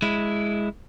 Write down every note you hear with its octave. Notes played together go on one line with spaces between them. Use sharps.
G#3 E4